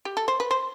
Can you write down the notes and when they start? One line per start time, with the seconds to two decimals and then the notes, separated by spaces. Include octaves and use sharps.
0.05 G4
0.17 A4
0.28 C5
0.40 B4
0.51 C5